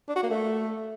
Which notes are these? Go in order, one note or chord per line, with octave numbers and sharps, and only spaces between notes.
D4
F#4
A#3
A3